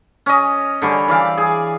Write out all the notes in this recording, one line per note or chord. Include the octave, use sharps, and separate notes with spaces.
C#4 D#5
D3 G3 C#4
E3 D5 F5 D6
G#4